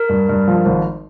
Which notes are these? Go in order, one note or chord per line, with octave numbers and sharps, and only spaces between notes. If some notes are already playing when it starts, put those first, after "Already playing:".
Already playing: A#4
G2
G2
F3
G#1